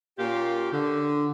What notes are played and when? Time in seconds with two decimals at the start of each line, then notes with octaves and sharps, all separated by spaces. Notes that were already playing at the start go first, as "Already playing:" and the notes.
0.19 A#2 A#3 C#4 F4 G4
0.72 D3